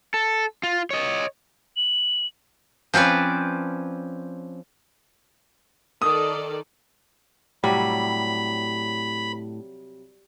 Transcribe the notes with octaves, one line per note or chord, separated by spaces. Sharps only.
A4
F4
C#5 D#5
F#7
F3 C4 C#4 B4 D5
D#3 A4 D5 D#6
A2 C3 F#3 G3 B5